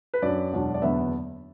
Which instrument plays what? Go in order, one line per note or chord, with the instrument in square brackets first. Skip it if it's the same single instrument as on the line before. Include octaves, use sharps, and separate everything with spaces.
[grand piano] B4
F#2 F#3 D4 D5
E1 E2 B2 F#3 D4
D5
F#1 E2 D3 B3 E5